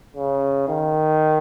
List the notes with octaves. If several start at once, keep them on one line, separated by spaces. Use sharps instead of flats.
C#3
D#3